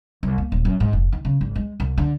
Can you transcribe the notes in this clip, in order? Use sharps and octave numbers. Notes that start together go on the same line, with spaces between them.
C2
A#3
D#1
F#2
G#2
F1
D#3
C#3
G#1
G#3
C2
D3